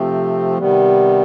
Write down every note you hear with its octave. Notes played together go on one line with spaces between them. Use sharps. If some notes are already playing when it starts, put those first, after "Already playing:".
Already playing: C3 F3 A3 C4
C3 D#3 G3 B3